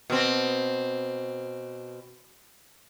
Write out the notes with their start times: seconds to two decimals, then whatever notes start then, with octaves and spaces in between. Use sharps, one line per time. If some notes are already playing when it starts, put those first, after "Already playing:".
0.10 B2 C4